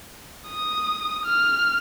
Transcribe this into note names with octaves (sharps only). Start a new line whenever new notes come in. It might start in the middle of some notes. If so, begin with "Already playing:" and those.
D#6
F6